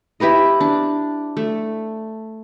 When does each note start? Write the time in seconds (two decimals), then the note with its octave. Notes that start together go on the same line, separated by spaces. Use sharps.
0.20 E4 G4 B4 D#5
0.61 D4
1.37 A3